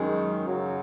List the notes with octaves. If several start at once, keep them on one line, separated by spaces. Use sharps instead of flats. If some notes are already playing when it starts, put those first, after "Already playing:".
Already playing: F#2 D#3 G#3
F#2 C#3 F#3